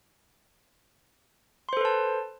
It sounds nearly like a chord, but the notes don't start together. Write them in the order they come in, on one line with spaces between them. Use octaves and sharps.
C6 C5 A4 B4 A5